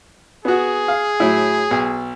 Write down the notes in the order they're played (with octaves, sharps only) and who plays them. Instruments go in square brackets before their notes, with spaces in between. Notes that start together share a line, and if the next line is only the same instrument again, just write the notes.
[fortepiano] B3 F#4 [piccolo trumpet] G#4
[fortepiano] F5
A2 F#3 E4
B1